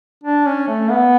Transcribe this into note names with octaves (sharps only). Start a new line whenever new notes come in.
D4
C#4
A3
B3